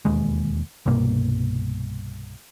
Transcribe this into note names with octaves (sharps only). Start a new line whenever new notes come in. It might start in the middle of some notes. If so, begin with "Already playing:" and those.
E1 D#2 G#3
C2 G2 B2 A#3